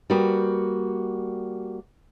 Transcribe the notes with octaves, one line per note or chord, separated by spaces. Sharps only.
G3 A#3 B3 F#4 G4